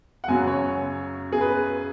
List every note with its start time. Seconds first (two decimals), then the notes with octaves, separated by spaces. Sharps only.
0.24 F#5
0.28 F#2 C#3 F#3 G#5
0.47 C#5
1.32 G#4
1.41 B4